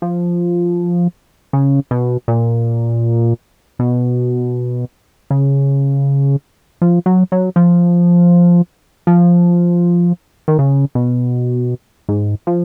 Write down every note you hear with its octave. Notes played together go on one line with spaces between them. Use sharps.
F3
C#3
B2
A#2
B2
C#3
F3
F#3
F#3
F3
F3
D#3
C#3
B2
G#2
F3